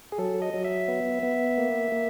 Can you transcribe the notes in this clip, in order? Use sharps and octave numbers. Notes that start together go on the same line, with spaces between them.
G#4
F#3 A4
D#5
F#3
E5
B3
B3
A#3
A#3